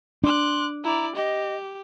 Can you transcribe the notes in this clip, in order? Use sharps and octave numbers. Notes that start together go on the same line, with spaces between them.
D4 C6 D6 F#6
E4 D5 A#5
G4 D#5